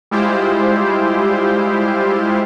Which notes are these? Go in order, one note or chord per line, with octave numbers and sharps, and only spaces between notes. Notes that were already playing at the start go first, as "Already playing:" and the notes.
G3 G#3 E4 F4 G4 C5